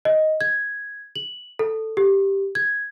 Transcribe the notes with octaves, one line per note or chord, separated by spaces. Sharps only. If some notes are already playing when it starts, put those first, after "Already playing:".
D#5
G#6
F#7
A4
G4
G#6